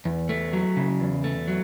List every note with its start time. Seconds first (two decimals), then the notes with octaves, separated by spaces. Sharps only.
0.05 E2
0.29 A3
0.53 F#3
0.77 C#3
1.00 E2
1.24 A3
1.48 F#3